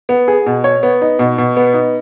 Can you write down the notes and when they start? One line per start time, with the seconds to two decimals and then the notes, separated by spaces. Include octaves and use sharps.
0.09 B3
0.28 G#4
0.46 B2
0.64 C#5
0.83 B3
1.02 D#4
1.19 B2
1.38 B2
1.57 B3
1.74 D#4